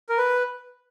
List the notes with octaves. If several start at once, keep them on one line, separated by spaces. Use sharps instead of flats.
A#4
B4